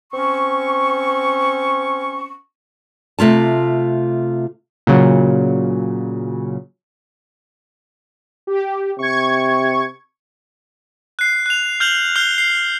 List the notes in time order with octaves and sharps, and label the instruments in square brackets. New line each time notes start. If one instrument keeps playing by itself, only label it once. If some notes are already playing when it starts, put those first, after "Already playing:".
[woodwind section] C4 C#4 C#6
[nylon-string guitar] C3 A3 F4 A5
[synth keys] A#2 C#3 F#3
[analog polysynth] G4
[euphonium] C3 [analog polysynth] C#6 G#6
[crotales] F#6 C7
F#6 F7
F6 G6 F7 F#7
F6 G6 C7 G7
C7